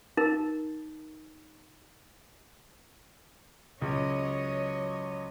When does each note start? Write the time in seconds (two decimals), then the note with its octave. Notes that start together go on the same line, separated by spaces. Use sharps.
0.17 D#4 A#4
3.82 C#2 F#3 C#5 D#5